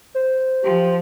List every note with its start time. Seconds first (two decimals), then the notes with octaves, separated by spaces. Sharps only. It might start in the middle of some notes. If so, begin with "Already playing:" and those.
0.15 C5
0.64 F3 G4